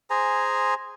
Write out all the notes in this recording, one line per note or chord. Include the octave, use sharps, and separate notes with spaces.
G#4 C5 G#5 A#5